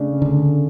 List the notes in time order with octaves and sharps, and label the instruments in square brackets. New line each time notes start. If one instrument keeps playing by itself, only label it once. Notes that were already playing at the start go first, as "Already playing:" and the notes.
Already playing: [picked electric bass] C#3 [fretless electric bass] A3 D4
[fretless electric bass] D3